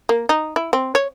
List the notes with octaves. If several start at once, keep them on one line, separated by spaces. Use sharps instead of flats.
A#3
D#4
E4
C4
C#5